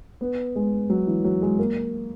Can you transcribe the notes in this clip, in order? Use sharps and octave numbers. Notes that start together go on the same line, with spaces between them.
B3
G#3
F#3
E3
F#3
G#3
A#3